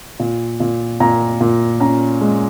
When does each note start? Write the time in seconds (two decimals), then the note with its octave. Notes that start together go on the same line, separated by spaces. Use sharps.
0.20 A#2
0.60 A#2
1.00 A#2 A#5
1.41 A#2
1.80 C#4 A#5
2.21 G#3